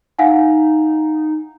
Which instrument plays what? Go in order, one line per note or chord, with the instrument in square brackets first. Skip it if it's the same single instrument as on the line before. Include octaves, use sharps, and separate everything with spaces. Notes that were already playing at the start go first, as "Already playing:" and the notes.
[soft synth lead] D#4 [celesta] F5 F#5 G#5